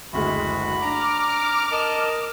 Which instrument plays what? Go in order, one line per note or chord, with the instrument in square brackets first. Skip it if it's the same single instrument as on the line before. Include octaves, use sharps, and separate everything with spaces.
[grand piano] F#1 D2 G#3 [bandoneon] F#4 [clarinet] B5
[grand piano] D4 A#6 [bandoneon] A#5 [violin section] D6 F6
[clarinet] A#4 [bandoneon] D#5 A5